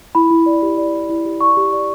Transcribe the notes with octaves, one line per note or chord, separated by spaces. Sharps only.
E4 B5
E4
D5
G4
D5
E4
E4
G4
D5 C#6
G4
D5